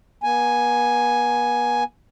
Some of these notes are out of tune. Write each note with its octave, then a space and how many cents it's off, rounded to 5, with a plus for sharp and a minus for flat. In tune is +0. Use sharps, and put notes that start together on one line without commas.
B3 -40 G#5 +5